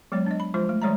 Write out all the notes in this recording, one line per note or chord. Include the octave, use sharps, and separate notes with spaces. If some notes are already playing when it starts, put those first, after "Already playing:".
F#3 G#3 B3 C#5
D4 D#5
B5
F3 G#3 F4 C5
A3
E3 G3 G#3 C#5 E5 A#5